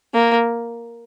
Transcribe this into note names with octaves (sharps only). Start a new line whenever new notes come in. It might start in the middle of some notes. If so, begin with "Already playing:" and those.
A#3